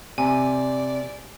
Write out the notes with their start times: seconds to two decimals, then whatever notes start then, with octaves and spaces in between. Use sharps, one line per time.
0.18 C3 D5 G#5